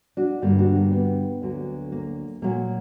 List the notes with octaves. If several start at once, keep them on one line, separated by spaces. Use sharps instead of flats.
D4 F#4
G2 D3 G3 A#3
D4 F#4
A#3
B3
D2 D3 F#3 A#3
A#3
A#2 F#3 A#3